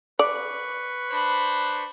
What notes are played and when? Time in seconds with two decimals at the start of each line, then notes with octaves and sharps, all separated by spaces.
0.19 B4 D5 C#6
1.11 D4 C5 B5